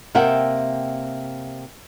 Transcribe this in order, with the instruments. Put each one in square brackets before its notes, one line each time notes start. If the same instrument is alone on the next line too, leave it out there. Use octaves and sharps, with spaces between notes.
[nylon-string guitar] C3 A#3 E5 F#5 G5